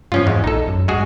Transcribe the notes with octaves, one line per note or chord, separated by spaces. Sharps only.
G2 F3 C#4 F4
E2 G#2 G#3
A#1 D#4 A4
F#2
G2 G#3 F#4 G#4